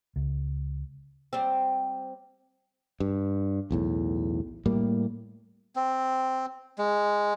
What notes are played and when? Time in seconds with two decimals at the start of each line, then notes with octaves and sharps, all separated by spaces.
0.16 C#2
1.33 G3 C4
3.00 G2
3.71 B1 E2 A2
4.66 A2 G3 A#3
5.76 C4
6.78 G#3